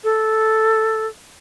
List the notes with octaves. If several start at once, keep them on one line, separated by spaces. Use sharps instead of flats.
A4